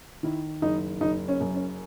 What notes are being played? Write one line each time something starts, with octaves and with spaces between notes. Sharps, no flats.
D#3 E4
F#1 D#4
F#1 D#4
C#4
F#2
C#4